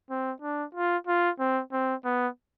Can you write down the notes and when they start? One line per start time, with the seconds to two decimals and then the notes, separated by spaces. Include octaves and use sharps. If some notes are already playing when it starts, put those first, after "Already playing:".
0.10 C4
0.42 D4
0.75 F4
1.07 F4
1.39 C4
1.72 C4
2.05 B3